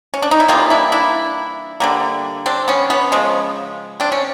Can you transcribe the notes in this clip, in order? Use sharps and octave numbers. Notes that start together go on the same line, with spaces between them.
C#4
D4
D#4
E4
E3 G3 A#3 D#4 F4
D4 E4
D4 E4
D3 G3 A#3
C4 D4
B3 C#4
B3 C#4
C#3 F3 G#3
C4 D4
C#4